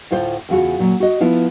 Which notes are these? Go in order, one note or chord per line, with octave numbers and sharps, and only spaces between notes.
D2 A2 F4 C5
E2 C#3 F4 F#4
A#2 F#3
F#4 D#5
F3 B3 E4 F4